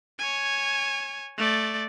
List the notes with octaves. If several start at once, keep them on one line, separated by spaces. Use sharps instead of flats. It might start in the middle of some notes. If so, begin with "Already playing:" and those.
C#5 G#5
A3 D5